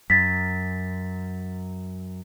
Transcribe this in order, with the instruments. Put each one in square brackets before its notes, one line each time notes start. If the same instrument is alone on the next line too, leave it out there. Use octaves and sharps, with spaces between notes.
[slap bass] F#2 [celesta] A6 B6